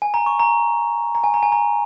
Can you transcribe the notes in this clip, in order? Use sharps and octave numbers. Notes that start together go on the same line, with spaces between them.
G#5
A#5
C#6
A#5
A#5
G#5
A#5
G#5
A#5